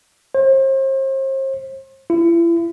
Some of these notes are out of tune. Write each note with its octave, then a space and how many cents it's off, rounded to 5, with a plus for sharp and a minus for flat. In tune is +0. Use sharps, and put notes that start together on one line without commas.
C5 +40
E4 +35